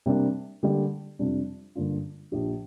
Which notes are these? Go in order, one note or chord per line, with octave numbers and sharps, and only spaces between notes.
C3 G3 A#3 D4
D3 G3 A#3 G4 D5
F2 C3 G3 D4
G2 D3 A#3 D4 F4
A#1 A#2 F3 D4 G4